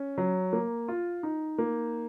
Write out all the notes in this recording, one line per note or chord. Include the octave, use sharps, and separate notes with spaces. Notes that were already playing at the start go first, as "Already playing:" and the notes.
Already playing: C#4
F#3
A#3
F4
D#4
A#3